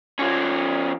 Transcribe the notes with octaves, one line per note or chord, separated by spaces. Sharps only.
F3 C#4